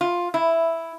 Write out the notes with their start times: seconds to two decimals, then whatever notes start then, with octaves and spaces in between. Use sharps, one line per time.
0.01 F4
0.34 E4